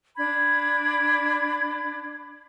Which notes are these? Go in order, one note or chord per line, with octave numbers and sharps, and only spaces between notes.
D4 B5 G#6